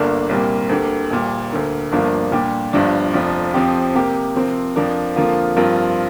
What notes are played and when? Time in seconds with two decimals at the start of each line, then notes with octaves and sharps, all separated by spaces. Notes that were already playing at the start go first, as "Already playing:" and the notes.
Already playing: G1 G2 D3 A#3 D4
0.29 C2 A#2 G3 A#3
0.69 D2 D3 A#3 G4
1.10 A#1 A#2 G3
1.50 D2 D3 A#3
1.92 G1 G2 F3 A#3 D4
2.32 A#2 G3 D4 G4
2.73 G1 G2 F3 D4
3.13 F1 F2 F3 D4
3.54 F2 F3 C4 G4
3.94 C3 A#3 G4
4.35 C3 F3 C4 A#4
4.76 F2 F3 D4 A#4
5.16 F2 D3 F3 A#3 F4
5.56 G2 F3 C4 F4 A#4